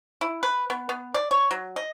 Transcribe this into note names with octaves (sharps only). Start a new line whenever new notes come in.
E4
B4
B3
B3
D5
C#5
F#3
D#5